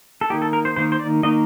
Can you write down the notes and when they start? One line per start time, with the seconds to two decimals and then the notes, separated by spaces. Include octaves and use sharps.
0.21 A4
0.30 D#3 A#3 D#4 G4
0.42 A4
0.53 A#4
0.65 C5
0.76 D#3 A#3 D#4 C5
0.92 C5
0.99 D5
1.23 D#3 A#3 D#4 D#5